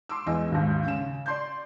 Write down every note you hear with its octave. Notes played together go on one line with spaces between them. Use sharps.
C6 D6 E6
E2 G#3 D#5 E6
G#1 D#2 G#2
C#3 E7
D5 C6 G6